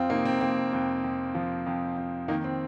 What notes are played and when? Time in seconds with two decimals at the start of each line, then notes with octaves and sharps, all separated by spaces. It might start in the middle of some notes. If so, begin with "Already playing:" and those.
Already playing: F2 C4 F4
0.09 C3 A#3 D#4
0.25 C4
0.41 F2 A#3
0.73 F2 C4
1.04 F2
1.35 F3
1.66 F2
1.97 F2
2.28 D#3 A#3 D#4
2.44 C4